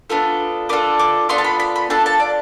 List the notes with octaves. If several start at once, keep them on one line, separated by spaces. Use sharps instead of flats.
B3 D4 F4 A4
B3 D4 F4 A4 D6
D6
B3 D4 F4 A4 C6
A5
B5
B5
B5
D4 F4 A4 A5
A5
D5